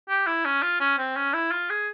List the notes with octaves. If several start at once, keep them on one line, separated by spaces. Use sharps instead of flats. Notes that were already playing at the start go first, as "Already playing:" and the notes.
G4
E4
C#4
F4
C#4
C4
C#4
E4
F4
G#4